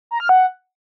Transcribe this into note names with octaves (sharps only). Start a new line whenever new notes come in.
A#5
F6
F#5